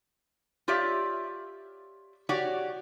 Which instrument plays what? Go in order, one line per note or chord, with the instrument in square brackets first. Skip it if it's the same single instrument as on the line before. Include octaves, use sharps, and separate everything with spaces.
[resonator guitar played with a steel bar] F4 G4 C#5 D5 E5
F#4 G4 C#5 D5